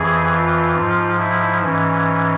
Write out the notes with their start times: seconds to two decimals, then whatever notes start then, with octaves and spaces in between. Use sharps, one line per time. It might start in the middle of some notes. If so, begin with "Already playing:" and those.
Already playing: F2 E3 G#4
0.33 F4
0.76 G#2 F3
1.19 E4
1.63 G#2 E3 C#4